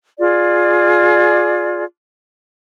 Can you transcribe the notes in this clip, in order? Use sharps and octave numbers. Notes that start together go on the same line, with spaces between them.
F4 G#4 D5